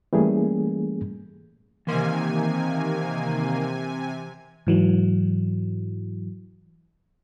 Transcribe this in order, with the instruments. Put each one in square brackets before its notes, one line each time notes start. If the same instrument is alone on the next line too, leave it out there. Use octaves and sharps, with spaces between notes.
[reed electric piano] E3 G3 A3 A#3 C#4 G#4
[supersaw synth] C3 G#5 [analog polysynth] D#3 A#3 [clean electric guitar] E3 C6
[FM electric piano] G#2 E3 F#3